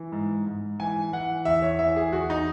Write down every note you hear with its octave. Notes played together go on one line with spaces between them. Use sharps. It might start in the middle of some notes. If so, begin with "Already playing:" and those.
Already playing: E3
G#2
G#2
E3 G#5
E3 F#5
E2 E5
C#5
E3 E5
G#4
E2 F#4
D#4